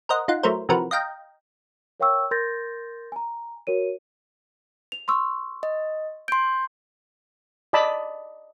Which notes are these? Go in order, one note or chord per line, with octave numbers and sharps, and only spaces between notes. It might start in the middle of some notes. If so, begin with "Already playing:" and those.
A#4 C5 D#5 F#5
D#4 F4 F#5
F#3 A3 E4 A#4 C5
C3 E3 F3 F#4 A#4 B4
D#5 F5 G5 A#5
A#4 C#5 F5 G5 C#6 E6
A#4 C6 G6 A6 A#6
G#5 A#5
F#4 A#4 C#5 D#7
F7
C6 C#6 E6
D#5
C6 G6 D7
D5 D#5 A5 B5